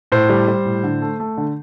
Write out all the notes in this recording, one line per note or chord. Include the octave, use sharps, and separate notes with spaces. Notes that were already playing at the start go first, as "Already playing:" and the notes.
A2 C5
G3
G3
A2
D3
A3
A3
D3